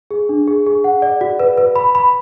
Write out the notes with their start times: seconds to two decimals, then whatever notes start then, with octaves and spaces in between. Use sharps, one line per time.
0.11 G#4
0.29 D4
0.47 G#4
0.66 G#4
0.84 F#5
1.02 D5
1.21 F#4
1.39 B4
1.57 B4
1.76 B5
1.95 B5